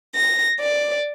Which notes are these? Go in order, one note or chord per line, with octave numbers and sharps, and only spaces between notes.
A#6
D5